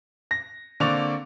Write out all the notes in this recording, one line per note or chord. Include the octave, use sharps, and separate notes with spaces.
A#6
D3 A#3 C4 D5 C#6 F7